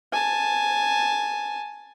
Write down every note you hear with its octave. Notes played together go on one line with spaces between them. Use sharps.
G#5 A5